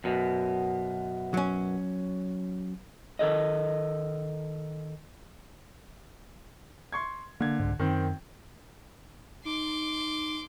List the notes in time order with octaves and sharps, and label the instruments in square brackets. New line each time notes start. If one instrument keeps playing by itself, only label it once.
[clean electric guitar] F#2 B2
[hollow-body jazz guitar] F#3 C#4
[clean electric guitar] D#3 A4 A#4 D#5
[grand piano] C6 C#6 G#6
[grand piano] D3 G#6 [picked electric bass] A#3
[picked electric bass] C2 G#2
[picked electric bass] F#2 [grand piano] D#3 C4
[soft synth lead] D#4 [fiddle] C6 D6